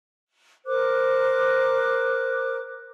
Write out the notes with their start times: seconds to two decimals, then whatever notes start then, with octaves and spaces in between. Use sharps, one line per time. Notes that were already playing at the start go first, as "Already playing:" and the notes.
0.66 A#4 C5 D6 F#6